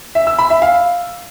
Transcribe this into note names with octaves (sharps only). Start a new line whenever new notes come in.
E5
E6
B5
E5
F5